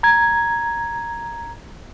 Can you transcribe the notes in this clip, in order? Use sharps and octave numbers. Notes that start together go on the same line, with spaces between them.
A#5 G#6